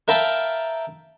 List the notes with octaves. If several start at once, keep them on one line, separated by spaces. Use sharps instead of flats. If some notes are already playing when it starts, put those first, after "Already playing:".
A#4 E5 F5 G5 A5 B5